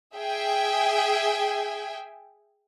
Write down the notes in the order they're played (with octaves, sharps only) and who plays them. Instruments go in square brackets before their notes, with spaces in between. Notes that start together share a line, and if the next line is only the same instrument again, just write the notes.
[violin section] G#4 E5 G5 G#5